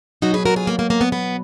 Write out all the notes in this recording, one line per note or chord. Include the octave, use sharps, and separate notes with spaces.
B2 F#3 D#4 F#4
G#4 B4
F#4 A#4
F4 G#4
A#3
A#3
A#3
B3
B3